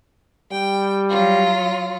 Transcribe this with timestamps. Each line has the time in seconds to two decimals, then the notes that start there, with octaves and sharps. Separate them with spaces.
0.51 G3 G5
1.10 F#3 F4